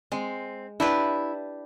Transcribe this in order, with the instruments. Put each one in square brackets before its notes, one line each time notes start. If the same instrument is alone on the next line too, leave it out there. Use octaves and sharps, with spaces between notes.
[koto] G#3 [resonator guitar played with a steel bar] C4
[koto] D4 G4 B4 [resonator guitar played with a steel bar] E4